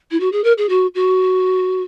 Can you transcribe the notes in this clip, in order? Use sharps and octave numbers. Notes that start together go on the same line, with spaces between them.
E4
F#4
G#4
A#4
G#4
F#4
F#4